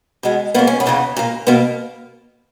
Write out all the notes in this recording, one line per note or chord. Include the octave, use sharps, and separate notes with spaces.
B2 G#3 B3
G#2 F#3 A#3 B3
C#4
B3
E2 C#3 E3 A#3
A#2 A#3
B2 A#3 B3